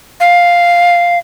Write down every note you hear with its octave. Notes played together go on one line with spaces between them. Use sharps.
F5